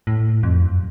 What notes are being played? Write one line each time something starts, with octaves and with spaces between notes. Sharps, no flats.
A2
F2
F#2